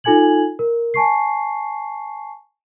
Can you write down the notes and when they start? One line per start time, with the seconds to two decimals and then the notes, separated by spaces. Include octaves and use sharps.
0.04 D#4 F4 A4 G#5 G#6 F#7
0.59 A#4
0.94 G#5 A5 C#6 C7